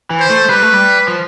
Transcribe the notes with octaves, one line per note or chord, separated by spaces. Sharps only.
E3
C5
A3
G3 B4
A3
G3
F3